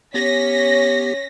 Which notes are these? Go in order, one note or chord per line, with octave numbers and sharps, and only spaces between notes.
B3 C#4 G4 C#5 A#6 B6